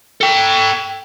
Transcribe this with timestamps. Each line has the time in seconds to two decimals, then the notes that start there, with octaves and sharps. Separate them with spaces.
0.21 A4 G5